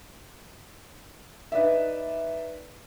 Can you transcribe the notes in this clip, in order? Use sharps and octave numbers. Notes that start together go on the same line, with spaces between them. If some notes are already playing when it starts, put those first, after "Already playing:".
D#4 B4 D5 E5